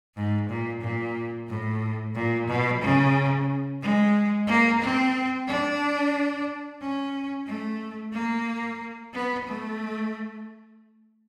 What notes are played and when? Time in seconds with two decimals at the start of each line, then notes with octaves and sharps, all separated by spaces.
0.15 G#2
0.49 A#2
0.81 A#2
1.48 A2
2.15 A#2
2.47 B2
2.81 C#3
3.81 G#3
4.47 A#3
4.80 C4
5.47 D4
6.81 C#4
7.46 A3
8.13 A#3
9.13 B3
9.47 A3